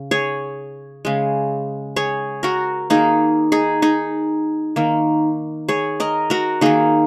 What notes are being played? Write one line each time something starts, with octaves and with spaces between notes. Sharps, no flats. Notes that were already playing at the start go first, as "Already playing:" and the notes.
Already playing: C#3
G#4 C#5
C#3 G#3
G#4 C#5
F#4 A#4
D#3 A#3 D#4 G#4
D#4 G#4
D#4 G#4
D#3 A#3
G#4 C#5
A#4 D#5
F#4 A#4
D#3 A#3 D#4 G#4